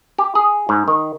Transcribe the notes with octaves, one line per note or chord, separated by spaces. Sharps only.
G4
G#4
G#2
D#3